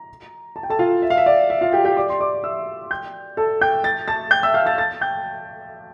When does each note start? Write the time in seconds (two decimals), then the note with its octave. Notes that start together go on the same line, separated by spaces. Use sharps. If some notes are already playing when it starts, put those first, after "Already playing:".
Already playing: A#5
0.56 A5
0.63 G5
0.70 A4 A5
0.79 F4 F5
1.02 E5
1.10 F5
1.17 E5
1.26 D5
1.50 E5
1.61 F4 F5
1.73 G4 G5
1.85 G4 G5
1.97 D5 D6
2.10 C6
2.20 D5 D6
2.44 E5 E6
2.90 G5 G6
3.37 A4 A5
3.61 G5 G6
3.84 A6
4.08 A5 A6
4.31 G5 G6
4.43 E5 E6
4.54 F5 F6
4.66 A5 A6
4.78 A5 A6
5.01 G5 G6